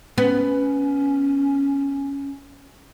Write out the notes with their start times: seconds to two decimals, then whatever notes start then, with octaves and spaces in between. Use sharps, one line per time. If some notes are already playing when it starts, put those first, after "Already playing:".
0.18 B3 C#4